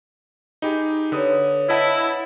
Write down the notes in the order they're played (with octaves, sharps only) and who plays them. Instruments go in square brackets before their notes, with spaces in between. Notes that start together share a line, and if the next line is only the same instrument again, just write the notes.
[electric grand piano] D#4 G4 G#4 [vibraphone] B5
[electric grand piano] D3 D#6 [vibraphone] B4 C#5
[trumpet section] E4 [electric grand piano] D#5 F#5 A5